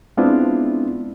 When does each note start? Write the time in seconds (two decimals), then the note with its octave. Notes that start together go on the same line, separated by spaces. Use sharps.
0.17 G#3 B3 C4 D4 E4 F4